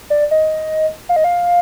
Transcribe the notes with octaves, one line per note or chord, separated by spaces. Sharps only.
D5
D#5
F5
D#5
F5